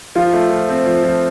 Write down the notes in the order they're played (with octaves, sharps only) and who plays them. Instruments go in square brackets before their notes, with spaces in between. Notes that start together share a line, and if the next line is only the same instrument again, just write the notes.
[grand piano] F3 [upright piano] F4
[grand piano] A3
F3
C4
F3
F3